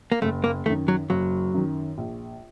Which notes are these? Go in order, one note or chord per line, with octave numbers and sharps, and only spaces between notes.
A#3
F#1 A3
A#3
F#2 D#3 A3
F#3
F#1 F#3
F#2 D#3
A#1